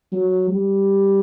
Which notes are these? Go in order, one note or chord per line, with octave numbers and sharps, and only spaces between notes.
F#3
G3